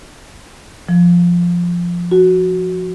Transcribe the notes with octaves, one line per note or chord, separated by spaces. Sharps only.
F3
F#4